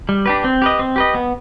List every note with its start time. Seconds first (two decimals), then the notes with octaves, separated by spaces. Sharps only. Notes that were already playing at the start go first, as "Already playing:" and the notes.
0.09 G3
0.26 D4 G4 B4
0.44 C4
0.62 G4 B4 D#5
0.79 C4
0.96 G4 B4 D#5
1.15 B3